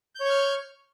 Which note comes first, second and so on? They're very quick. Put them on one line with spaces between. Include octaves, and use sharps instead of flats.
G6 C#5 C#6 F6